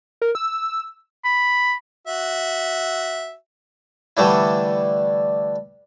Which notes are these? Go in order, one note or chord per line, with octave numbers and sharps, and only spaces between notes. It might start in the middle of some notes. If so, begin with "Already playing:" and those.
A#4
E6
B5
F#4 E5
D3 E3 G3 A3 D4 E4